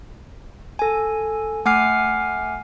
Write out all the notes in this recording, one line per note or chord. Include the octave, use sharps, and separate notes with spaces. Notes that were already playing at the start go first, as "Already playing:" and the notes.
A4 G#5
A3 F#5 G#5 D6 F6 C7